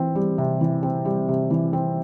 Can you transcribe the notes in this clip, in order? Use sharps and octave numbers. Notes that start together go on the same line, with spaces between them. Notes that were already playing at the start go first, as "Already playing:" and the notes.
Already playing: E3 C4
G3
C3
E3
C4
G3
C3
E3
C4